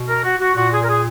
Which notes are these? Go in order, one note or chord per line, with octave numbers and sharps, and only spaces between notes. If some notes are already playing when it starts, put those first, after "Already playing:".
Already playing: B2
A#4
F#4
F#4
A#2 F#4
G#4
A#4
G#4